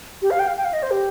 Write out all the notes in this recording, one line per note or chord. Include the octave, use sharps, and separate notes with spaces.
G4
F5
G5
F5
G5
F5
D#5
C5
G4